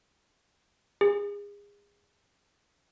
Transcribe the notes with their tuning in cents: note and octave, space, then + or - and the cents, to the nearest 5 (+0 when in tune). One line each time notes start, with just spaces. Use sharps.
G#4 -30